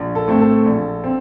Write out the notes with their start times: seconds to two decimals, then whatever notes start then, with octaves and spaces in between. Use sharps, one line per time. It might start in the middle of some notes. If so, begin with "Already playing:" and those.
Already playing: A#1
0.15 A4
0.27 A2 A3 C4
0.41 A4
0.66 A#1
1.04 C4